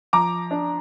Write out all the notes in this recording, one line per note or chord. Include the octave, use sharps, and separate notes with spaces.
F3 A#5 D6
D4